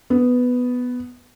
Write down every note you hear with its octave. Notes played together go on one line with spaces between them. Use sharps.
B3